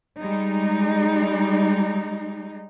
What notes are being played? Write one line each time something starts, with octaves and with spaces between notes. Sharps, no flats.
G3 G#3 D#4